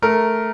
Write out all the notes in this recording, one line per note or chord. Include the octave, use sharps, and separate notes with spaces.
A3 A#4